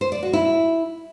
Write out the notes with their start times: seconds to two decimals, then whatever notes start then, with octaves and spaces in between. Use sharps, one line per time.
0.01 C5
0.12 D5
0.23 F#4
0.33 E4